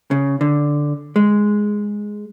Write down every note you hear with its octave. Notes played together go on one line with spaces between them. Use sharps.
C#3
D3
G#3